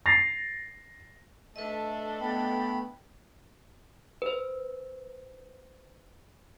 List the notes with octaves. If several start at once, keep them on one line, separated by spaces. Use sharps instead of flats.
A6 A#6 C7 F7
A3 D4 A4 B4 D#5 E5
A3 B3 G5 B5
B4 C5